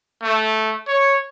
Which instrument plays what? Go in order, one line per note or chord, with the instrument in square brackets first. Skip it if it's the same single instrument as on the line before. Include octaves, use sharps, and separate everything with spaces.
[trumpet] A3
C#5